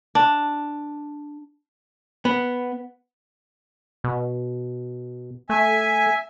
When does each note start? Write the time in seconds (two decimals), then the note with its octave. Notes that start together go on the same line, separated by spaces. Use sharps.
0.15 D4
2.25 B3
4.04 B2
5.50 A3 E5 G#5